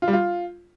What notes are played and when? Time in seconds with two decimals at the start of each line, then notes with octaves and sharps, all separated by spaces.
0.02 F4
0.08 G3
0.13 F4